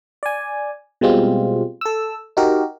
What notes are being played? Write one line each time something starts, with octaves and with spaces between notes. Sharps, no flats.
D5 G#5
B2 G3 G#3 C4 F4
A4 E6
D#4 F#4 G4 A#4